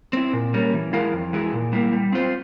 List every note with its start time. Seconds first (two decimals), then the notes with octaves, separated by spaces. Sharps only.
0.13 C4 E4
0.33 A#2
0.54 G3 A#3 C#4
0.74 E3
0.93 G#3 E4 A#4 F5
1.13 F2
1.33 E3 G#3 E4
1.53 A#2
1.73 G3 A#3 E4
1.93 G3
2.12 C4 F4 C5